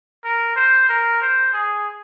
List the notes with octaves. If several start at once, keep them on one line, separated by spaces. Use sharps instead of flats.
A#4
C5
A#4
C5
G#4